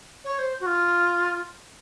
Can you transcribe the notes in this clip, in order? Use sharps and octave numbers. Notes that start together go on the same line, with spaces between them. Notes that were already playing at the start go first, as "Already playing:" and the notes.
C#5
C5
F#4
F4